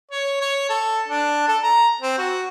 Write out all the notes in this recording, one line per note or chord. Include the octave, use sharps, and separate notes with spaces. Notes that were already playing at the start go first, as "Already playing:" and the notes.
C#5
C#5
A4
D4
A4
A#5
C4
F#4